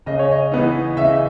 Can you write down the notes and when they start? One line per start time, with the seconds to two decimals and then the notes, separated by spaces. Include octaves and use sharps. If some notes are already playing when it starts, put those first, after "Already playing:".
0.06 C#3 D#5
0.19 C#5
0.31 D#5
0.52 E3 B3 D#4
0.97 C#3 E5
1.07 D#5